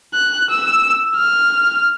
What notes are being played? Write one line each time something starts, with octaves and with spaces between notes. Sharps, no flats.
F#6
E6
F6